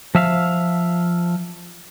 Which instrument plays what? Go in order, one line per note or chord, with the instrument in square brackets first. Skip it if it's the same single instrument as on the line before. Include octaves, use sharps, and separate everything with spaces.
[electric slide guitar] F3 E5 F5